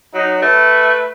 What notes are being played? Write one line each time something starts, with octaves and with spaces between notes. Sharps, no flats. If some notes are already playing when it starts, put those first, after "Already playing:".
F#3 D#4
A3 B4